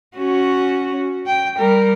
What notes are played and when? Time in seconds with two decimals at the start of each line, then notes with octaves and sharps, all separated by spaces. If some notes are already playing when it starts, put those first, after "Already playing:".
0.17 C#4 F#4
1.27 G5
1.58 G3 A#4